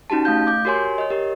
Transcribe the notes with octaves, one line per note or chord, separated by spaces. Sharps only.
C#4 D#4 F#4 G4 A5
A3 F5 G6
D6 G6
F#4 G4 A#4 C#5 G#5 C6
C#5 D#5
G4 A#4 D#5